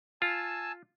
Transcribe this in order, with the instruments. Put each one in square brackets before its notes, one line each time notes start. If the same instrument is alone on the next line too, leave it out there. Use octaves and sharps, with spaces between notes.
[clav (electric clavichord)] F4 [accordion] G#5 A5 E6